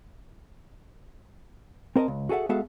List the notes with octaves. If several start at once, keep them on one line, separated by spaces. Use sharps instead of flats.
C4 A#4 D5 D#5 A5
C#2
F#4 G#4 A4 E5 F#5
G#3 B3 F#4 A4 E5 F5